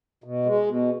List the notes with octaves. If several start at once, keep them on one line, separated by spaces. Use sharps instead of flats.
B2
G#3
B2